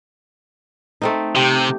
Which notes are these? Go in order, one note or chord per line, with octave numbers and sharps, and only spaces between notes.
A3 C4 D#4
C3 G4